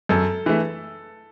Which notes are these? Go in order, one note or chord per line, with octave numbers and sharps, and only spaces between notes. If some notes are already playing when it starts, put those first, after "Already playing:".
F#2 A4
E3 A3